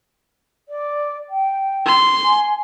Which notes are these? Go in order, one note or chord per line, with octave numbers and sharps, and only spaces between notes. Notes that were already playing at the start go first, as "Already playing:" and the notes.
D5
G5
C6
G#5